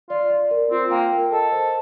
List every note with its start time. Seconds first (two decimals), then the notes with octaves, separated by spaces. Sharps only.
0.09 F4 D5
0.30 D5
0.51 A#4
0.71 C4 F4
0.91 A#3 G5
1.12 A#4
1.32 A4 D#5
1.52 C5